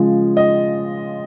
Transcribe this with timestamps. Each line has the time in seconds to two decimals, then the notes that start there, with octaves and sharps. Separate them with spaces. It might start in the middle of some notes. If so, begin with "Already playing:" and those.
Already playing: C#3 F3 G#3
0.37 D#5